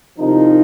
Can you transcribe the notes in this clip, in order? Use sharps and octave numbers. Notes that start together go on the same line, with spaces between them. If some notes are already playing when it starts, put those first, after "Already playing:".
C2 C3 D#3 F3 D#4